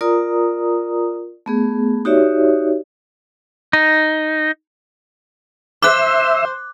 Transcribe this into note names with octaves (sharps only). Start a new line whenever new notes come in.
F4 A#4 D5 A#5 D#6
A3 B3 G#4
D#4 F#4 G4 C#5 D5 E5
D#4
C5 E5 D6 F#6